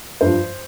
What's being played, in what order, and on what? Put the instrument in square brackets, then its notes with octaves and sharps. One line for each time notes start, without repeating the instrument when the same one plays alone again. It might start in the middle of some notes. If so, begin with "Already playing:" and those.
[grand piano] G2 F3 C5